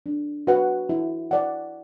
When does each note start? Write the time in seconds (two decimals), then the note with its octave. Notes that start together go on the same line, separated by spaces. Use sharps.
0.06 D4
0.47 F#4 B4 F#5
0.89 E4
1.31 D5 F#5